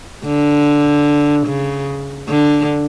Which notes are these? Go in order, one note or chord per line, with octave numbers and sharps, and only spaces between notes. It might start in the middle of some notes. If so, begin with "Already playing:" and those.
D3
C#3
D3